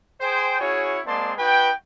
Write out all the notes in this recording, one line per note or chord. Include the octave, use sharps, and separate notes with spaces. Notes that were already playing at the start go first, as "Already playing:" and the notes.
G#4 C5 G5
C#4 E4 F#4 G#4 C#5
G#3 A#3 C4 D5 A5 C6
D#4 F#4 B4 G5